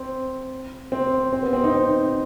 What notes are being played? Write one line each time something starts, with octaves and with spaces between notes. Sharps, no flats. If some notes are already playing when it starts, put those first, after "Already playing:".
Already playing: C4
C4
C4
B3
C4
D#4
C4